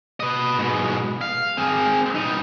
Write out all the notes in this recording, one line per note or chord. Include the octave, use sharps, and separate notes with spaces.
B4 D#5
G#2 B2
F5
C4 G#4
G3 D#4